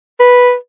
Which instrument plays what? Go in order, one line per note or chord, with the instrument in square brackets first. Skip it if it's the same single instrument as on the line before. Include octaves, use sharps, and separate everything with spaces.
[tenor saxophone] B4